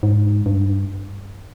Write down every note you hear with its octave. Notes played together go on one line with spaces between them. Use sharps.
G#2
G2